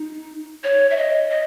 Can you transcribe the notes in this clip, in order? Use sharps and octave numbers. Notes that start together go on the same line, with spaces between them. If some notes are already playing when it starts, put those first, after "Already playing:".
Already playing: D#4
C#5
E5
D#5
D#5